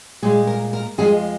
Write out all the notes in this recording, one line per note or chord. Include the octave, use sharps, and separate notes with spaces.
A#2 G#3 G#4
A#4
A#4
F2 F3 G#3 G#4